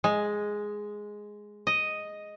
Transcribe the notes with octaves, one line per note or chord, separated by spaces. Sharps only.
G#3
D#5